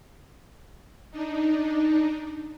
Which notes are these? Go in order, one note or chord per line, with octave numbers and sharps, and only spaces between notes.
D4 D#4